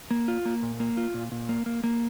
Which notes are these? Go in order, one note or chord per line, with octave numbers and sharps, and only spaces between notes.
A#3
F4
A#3
A#2
A#3
F4
A#2
A#2
A#3
A#3
A#3